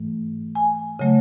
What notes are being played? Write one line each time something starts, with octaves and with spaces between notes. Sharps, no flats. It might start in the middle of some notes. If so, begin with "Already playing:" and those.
Already playing: G#2 E3 A3
G#5
C#3 F#3 A3